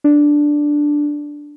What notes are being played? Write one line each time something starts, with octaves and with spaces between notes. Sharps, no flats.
D4